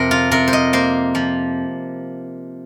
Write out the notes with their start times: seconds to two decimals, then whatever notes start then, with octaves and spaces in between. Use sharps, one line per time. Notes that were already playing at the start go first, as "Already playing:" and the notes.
Already playing: F2 C3 A#4 C5
0.11 F4
0.31 C3 A#4
0.48 C5
0.53 D#5
0.73 A#3 C5
1.15 F3